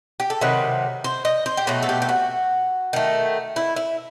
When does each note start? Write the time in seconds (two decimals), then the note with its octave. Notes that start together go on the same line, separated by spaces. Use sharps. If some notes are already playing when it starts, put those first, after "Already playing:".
0.20 G4
0.30 A4
0.41 C3 D#3 F#3 B4
1.04 C5
1.25 D#5
1.46 C5
1.57 G4
1.67 B2 F#3 A3 A4
1.83 A4
1.89 G4
2.02 G4
2.09 F#4
2.93 D#3 A3
3.56 E4
3.76 E4